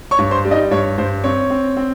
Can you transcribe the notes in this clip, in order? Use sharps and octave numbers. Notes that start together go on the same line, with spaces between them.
C#5 C#6
G2
C5 C6
G3
D#4 D#5
G2 C#5
G2 C5
C4 C#5
C4
C4